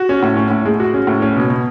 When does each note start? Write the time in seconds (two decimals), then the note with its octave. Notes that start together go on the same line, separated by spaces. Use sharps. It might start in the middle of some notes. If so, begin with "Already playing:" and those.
Already playing: F#4
0.09 C#4
0.23 A2
0.37 C#4
0.50 A2
0.65 G#3
0.80 F#4
0.94 C#4
1.07 A2
1.22 C#4
1.36 B2
1.50 B2